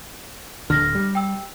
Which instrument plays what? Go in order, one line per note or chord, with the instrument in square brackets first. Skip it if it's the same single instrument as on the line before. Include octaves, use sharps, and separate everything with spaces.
[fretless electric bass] D1 D3 [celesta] F6 A#6
[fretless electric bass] G3
[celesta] G5 E6